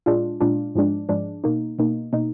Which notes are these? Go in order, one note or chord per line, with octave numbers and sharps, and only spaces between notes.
A#2 G#3 D4 F4
A#2 G#3 D4 F4
G#2 F3 G#3 D4
G#2 F3 G#3 D4
B2 A#3 D#4
B2 A#3 D#4
B2 A#3 D#4